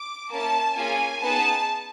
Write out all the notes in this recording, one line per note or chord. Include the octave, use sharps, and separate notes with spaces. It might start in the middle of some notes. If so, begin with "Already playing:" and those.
Already playing: D6
A#3 C#4 E4 A5
A#3 C#4 F4 G#4 G#5
B3 D#4 G#4 A5